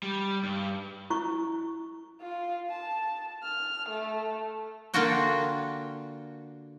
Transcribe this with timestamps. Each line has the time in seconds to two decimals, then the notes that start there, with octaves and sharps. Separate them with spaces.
0.03 G3
0.43 G2
1.10 E4 C#6
2.21 F4
2.70 A5
3.43 F6
3.90 A3
4.94 D3 A#3 D4 F4 F#4 G5